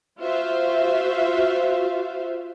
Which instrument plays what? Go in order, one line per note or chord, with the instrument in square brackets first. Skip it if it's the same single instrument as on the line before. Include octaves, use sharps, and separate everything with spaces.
[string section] F4 F#4 C5 E5 F5